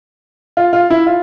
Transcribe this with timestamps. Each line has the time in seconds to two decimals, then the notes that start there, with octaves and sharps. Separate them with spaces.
0.57 F4
0.73 F4
0.90 E4
1.06 F4